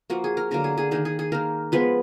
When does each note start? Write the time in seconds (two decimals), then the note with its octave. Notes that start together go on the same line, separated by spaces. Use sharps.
0.10 F3 A#3 F#4
0.24 G#4
0.37 A#4
0.51 D3 F#3 A#3 A#4
0.64 G#4
0.78 G#4
0.91 D#3 A#3 G#4
1.05 G#4
1.19 G#4
1.32 D#3 A#3 A#4
1.72 F3 G#3 B3 B4